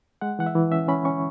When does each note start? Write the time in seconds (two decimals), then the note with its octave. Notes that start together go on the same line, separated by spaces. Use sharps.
0.21 G#3 F#5
0.39 E3 F#5
0.46 E5
0.55 E3
0.72 C#4 E5
0.88 C#4 B5
1.05 C#4 C#6